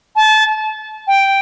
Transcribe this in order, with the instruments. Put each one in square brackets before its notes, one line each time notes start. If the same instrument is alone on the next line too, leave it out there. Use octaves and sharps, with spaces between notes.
[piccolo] A5
G5